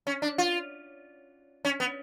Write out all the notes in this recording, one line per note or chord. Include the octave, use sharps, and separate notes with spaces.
C#4
D4
F4
C#4
B3